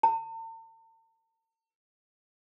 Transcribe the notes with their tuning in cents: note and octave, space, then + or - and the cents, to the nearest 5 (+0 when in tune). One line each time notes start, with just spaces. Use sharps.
A5 +45